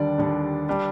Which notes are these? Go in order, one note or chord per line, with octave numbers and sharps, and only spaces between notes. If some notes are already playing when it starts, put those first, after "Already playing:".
Already playing: D#2 D3 G3 D4 D5
D#2 D3 G3 D4
G3 D4